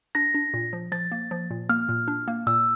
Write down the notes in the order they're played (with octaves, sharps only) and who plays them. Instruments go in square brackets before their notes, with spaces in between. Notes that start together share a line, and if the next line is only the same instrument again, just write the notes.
[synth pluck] D4 [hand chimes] A#6
[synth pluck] D4
A#2
F3
[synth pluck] F3 [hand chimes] A6
[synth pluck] A#3
F3
A#2
[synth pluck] A#3 [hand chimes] F6
[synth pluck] A#2
D4
A#3
[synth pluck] A#2 [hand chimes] E6